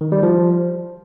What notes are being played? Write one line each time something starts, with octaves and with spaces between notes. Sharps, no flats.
D#3
G3
F3